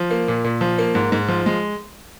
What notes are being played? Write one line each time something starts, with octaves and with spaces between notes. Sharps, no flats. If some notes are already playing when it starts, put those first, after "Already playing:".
Already playing: F3
A#3
A#2
A#2
F3
A#3
G#2
G#2
F3
G#3